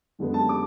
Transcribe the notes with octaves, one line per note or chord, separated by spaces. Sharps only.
F#2 D3 G#3 B3
A5
D6